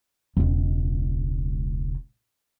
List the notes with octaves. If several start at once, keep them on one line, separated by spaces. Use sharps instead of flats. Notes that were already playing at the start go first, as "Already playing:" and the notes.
E1 C#2